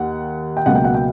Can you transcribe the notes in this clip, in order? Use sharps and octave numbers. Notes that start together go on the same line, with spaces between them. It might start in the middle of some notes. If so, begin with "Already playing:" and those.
Already playing: D#2 F#5
G5
C#2 B2 F#3 A#3 F#5
G5
F#5
G5